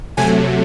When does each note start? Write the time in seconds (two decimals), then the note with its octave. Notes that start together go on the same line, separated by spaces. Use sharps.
0.17 C3 F#3 A3 G#5